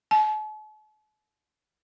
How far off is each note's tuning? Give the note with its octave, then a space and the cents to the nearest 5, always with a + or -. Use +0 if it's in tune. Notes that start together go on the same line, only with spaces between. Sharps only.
A5 -45